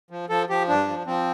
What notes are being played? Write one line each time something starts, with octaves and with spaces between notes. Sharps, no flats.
F3
F3 A4
F3 G4
G2 D4
F3
F3 C4